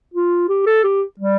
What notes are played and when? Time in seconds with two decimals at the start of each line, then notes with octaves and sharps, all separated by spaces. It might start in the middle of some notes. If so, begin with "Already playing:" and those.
0.14 F4
0.49 G4
0.66 A4
0.84 G4
1.20 G3